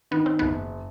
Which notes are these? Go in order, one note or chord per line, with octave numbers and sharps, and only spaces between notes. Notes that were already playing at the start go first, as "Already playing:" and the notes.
D#3 B3
C4
F#1 B3